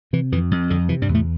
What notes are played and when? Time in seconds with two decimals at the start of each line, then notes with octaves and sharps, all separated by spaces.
0.13 C3 E3
0.32 F2 E3
0.51 F2
0.70 F2 D3
0.89 C3 E3
1.02 G2 G3
1.08 E2
1.14 A2 A3